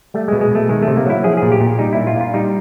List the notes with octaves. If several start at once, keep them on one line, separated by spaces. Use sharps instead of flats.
G3 A3
G#3
B2
G#3
B2 A3
D#3 G#3
A3
C3
A#3
F#3 E4
F3 G#4
A#2 G#4
G4
A#2
G3 D#4
A#2 E4
F4
A#2
F4
G3 D#4